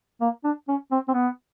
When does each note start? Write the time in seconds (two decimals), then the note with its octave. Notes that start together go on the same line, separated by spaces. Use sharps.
0.21 A#3
0.44 D4
0.68 C#4
0.91 C4
1.08 C4
1.14 B3